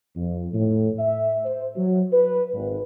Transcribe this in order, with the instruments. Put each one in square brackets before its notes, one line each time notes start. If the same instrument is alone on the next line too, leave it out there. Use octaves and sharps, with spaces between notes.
[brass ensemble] F2
A2
E5
C5
F#3
B4
G#1